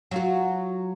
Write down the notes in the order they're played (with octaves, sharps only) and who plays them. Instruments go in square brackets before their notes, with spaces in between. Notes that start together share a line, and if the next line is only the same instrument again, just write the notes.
[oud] F#3 F4 F#4